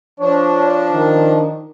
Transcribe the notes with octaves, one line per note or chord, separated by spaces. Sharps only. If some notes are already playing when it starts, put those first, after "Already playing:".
F3 D4 C#5
D#3